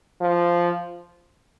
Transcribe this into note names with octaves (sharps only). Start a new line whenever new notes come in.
F3